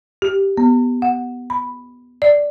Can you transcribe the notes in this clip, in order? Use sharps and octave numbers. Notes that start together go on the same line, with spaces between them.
G4
B3
F#5
B5
D5